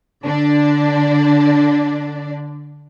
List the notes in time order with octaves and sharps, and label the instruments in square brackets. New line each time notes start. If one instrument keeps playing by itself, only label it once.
[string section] D3 D4 D5